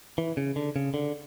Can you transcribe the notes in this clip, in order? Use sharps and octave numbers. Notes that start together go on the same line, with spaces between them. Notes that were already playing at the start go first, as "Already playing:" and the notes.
E3
C#3
D3
C#3
D3